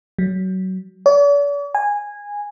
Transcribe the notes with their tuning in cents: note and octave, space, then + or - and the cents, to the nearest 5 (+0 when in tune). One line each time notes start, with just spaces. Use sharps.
F#3 +20
D5 -45
G#5 -15